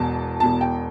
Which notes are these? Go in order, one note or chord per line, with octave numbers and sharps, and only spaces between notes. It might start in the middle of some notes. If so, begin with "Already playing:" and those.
Already playing: E1 E2 B2 A5
E1 E2 B2 A5
G5